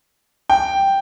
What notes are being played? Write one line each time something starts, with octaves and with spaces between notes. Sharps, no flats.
G5